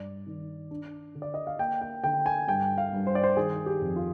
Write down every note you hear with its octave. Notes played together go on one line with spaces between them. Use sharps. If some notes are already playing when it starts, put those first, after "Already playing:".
Already playing: G2 D5
D#3
D4
D3
D5
D#5
F5
A#3 G5
G5
D3 G5
G#5
G2 G5
F5
G2
C5
D5
C5
D#3 G#4
G4
F2
F4